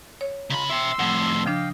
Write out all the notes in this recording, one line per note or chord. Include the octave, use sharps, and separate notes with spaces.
C#5
C#3 G#3 F4 A#5 B5
E5 G5 C6 E6
F2 A2 F#5
C#3 F3 D4 D#5 F5 G5